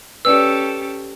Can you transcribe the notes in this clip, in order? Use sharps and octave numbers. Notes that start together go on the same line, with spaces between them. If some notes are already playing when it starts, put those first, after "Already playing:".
C#4 G4 A4 B4 D5 E6